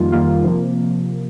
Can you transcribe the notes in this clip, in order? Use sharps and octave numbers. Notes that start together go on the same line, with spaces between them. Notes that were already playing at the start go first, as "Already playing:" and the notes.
Already playing: F2 D#3 G3 A#3 F4
F2 D#3 G3 A#3 F4
C3 F3 A#3